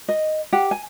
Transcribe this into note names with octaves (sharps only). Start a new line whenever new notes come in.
D#5
G4 F#5
G#5